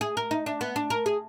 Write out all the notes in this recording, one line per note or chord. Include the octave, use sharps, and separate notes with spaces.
G#4
A#4
D#4
D4
B3
D4
A#4
G#4